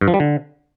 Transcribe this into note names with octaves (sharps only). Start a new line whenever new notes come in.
G2
F3
G3
D3